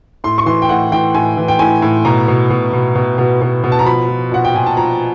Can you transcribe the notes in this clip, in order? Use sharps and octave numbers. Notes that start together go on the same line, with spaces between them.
A2 C6
C#6
E3 C6
G5
A2 F#5
E3 G5
A2 G#5
E3
G5
A2 G#5
A2
B2 A#5
B2
B2
B2
B2
B2
B2
B2
A5
A#5
F3 B5
F3
A#2 F#5
G5
A#2 G#5
A5
F3 A#5